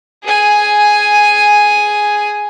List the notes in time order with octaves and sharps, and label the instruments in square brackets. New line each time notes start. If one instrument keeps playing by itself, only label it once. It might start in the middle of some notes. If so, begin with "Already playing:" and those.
[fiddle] G#4 G#5